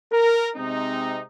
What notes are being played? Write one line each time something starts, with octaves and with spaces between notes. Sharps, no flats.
A#4
C3 G#3 C4 D#4